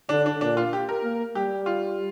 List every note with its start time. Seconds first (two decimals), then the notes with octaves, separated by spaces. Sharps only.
0.09 D3 D4
0.26 D4
0.41 A#2 D4
0.57 F4
0.73 G4
0.89 A#4
1.03 A#3
1.35 G3 G4
1.66 F4